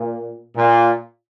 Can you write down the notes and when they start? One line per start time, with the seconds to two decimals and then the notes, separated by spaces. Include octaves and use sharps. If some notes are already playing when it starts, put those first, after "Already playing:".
Already playing: A#2
0.56 A#2